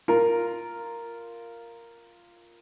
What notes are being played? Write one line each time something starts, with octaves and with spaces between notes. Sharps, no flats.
F4 A#4